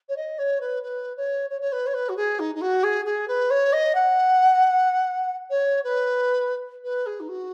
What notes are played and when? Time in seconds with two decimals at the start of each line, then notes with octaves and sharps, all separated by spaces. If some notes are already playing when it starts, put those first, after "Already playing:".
0.09 C#5
0.17 D#5
0.39 C#5
0.61 B4
0.83 B4
1.17 C#5
1.50 C#5
1.61 C#5
1.72 B4
1.87 C#5
1.94 B4
2.09 F#4
2.17 G#4
2.39 D#4
2.55 D#4
2.61 F#4
2.84 G#4
3.05 G#4
3.28 B4
3.50 C#5
3.73 D#5
3.95 F#5
5.50 C#5
5.84 B4
6.84 B4
7.06 G#4
7.20 D#4
7.29 F#4